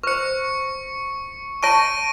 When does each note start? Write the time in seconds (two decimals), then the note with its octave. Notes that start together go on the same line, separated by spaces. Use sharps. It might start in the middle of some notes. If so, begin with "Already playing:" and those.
0.03 B4 C5 C#6 C#7
1.63 C#5 A5 C#6 A#6 D7 D#7